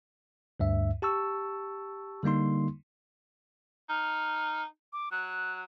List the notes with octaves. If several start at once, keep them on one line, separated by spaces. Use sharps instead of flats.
D2 G2 E5
G4 A5 C#6 E6
D3 G3 A#3 D#4 C6
D#4 F6
D6
F#3 F#6